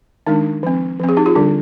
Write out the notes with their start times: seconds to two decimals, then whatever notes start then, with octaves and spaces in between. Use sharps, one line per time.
0.27 D#3 G#3 D4 D#4
0.63 F3 C4
1.00 F3 C4
1.09 G#4
1.17 D#4 G4
1.26 F4 G#4
1.35 D3 G3 D4